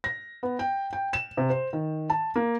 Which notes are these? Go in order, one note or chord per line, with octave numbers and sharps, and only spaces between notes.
A#6
B3
G5
G5
E7
C3
C5
D#3
A5
A#3